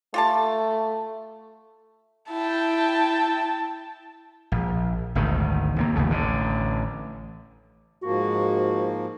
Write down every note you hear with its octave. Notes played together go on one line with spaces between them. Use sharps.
A3 F4 G4 A5
E4 G5 A5
A#1
G#1 D2 D#3
D#2 C3 A#3
F1 D#2 C#3 A3
A1 D3
G#2 F3 A#3 F#4